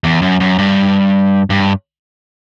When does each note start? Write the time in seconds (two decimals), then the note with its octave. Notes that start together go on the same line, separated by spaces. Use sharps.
0.04 E2
0.22 F#2
0.40 F#2
0.58 G2
1.50 G2